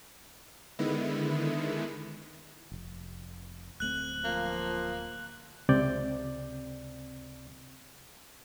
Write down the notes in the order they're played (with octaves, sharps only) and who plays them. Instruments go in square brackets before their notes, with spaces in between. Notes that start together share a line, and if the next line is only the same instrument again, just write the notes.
[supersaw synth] D3 D#3 G#3 B3 E4
[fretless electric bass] F1
[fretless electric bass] D1 A3 C4 [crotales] F#6 F#7
[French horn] F3 [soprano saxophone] A#3
[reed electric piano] C#2 C3 C4 D5 G6